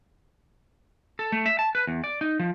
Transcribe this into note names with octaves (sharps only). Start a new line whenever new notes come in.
A4
A3
E5
A5
B4
E2
D5
D#4
F3